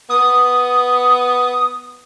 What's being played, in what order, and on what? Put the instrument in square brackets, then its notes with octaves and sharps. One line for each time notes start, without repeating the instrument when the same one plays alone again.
[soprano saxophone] B3 [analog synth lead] D#6